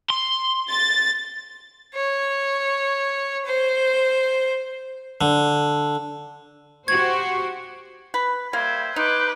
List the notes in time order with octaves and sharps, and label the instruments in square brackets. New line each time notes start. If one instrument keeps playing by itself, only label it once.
[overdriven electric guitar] C6
[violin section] A6
[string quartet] C#5
C5
[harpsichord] D3
[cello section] F#4 G4 C5 [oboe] C#6 [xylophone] G#6
[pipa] B4
[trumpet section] G3 C5 E5 [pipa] A#3 [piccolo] G#6
[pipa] D#4 [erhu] B4 [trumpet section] B5 C6 D6 [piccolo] G6